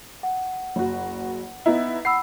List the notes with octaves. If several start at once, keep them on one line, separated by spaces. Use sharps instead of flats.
F#5
F#1 F#4
B3 D#4 E4
F#5 B5 E6 C7